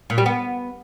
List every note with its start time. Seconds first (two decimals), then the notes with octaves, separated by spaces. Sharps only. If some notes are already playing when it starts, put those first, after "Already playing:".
0.10 A#2
0.18 G3
0.26 B3